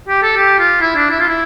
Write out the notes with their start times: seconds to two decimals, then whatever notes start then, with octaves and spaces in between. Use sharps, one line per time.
0.09 G4
0.23 A4
0.37 G4
0.59 F4
0.81 E4
0.96 D4
1.10 E4
1.20 F4
1.28 E4